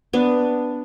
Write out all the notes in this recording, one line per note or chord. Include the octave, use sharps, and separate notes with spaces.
B3 D4